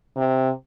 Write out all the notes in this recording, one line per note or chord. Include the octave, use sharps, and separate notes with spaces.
C3